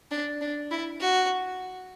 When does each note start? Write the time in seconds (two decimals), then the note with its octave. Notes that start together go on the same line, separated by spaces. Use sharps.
0.11 D4
0.41 D4
0.71 E4
1.01 F#4